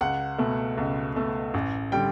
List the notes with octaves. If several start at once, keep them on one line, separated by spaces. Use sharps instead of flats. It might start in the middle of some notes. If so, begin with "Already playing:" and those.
C#2 F#5
B2 A3
C#2
B2 A3
A1
D3 G3 G5